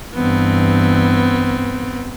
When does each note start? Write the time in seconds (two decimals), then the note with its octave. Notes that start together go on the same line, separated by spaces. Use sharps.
0.15 G2 E3 B3 C4